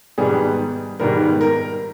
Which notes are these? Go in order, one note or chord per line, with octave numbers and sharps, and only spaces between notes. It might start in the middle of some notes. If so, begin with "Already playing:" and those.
G#2 D#3 G3 B3 G#4
G#2 D#3 G3 B3 A#4
A#4